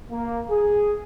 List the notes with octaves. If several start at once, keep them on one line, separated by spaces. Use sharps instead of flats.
A#3
G#4